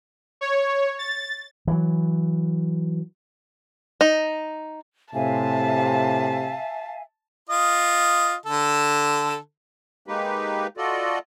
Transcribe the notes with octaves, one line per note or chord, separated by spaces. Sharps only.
C#5
A6
E3 F#3
D#4
A2 C3 E5 F5 G#5 A5
F4 D#5
D3 A4
G#3 A#3 D#4 G4 B4
F4 F#4 A4 D5 D#5